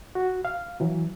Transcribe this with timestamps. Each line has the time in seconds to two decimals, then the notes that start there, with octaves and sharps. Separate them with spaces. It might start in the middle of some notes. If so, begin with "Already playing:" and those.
0.15 F#4
0.45 F5
0.80 E3 F#3